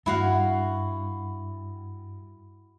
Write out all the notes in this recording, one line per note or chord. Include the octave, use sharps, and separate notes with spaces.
G2 E4 F#4 F5